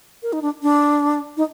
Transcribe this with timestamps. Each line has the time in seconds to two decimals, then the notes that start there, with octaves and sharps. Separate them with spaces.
0.23 A#4
0.33 D#4
0.42 D4
0.62 D4
1.37 D#4